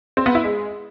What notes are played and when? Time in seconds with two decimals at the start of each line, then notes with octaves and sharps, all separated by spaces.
0.17 C4
0.26 B3
0.35 E4
0.44 G#3